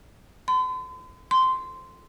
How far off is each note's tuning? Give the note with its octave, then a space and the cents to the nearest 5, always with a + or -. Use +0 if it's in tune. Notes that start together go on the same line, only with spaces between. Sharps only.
C6 -45
C6 -10